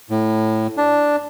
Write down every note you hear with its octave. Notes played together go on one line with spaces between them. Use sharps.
A2
D4